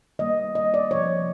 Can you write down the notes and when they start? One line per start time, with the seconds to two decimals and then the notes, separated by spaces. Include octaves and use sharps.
0.19 D#3 G3 A#3 D#5
0.55 D#5
0.74 D5
0.91 C3 F3 A3 C#5